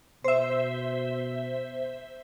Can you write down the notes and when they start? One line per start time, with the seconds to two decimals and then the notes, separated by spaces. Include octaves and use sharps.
0.24 B2 C5 E5